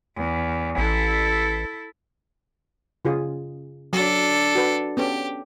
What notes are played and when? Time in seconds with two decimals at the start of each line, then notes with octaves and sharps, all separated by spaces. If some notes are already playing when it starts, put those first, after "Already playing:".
0.16 E2
0.78 A1 E4 A4
3.05 C#3 F4 G#4
3.93 F#3 D4 A4
4.55 F#4 B4
4.97 B3 C#4 G4 A4